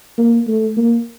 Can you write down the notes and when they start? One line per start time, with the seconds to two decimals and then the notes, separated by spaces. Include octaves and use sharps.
0.18 A#3
0.47 A3
0.77 A#3